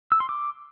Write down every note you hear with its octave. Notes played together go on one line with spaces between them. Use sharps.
E6
C6
D6